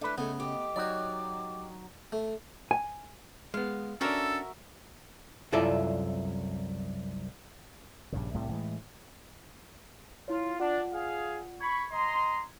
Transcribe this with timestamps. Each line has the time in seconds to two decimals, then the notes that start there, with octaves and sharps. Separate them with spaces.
0.01 A3 D4 E4 B4
0.18 C#3 G#3 A3 B3
0.40 G4 D#5 D6
0.76 F#3 D#4 F#4 C#5 D5
2.12 A3
2.71 G#5
3.54 G#3 B3 F5
4.01 C#4 D4 F#4 A4 A#4 E5
5.52 C2 F#2 E4 F4 A4 D5
8.12 A#1 G2 C#3
8.34 C2 A2 C3 G3
8.49 A2 E3 G#3
10.28 E4 F4 C#5
10.60 D4 F4 D5 F#5
10.92 G#4 F5
11.61 B5 C#6 G#6
11.91 D#5 A#5 C6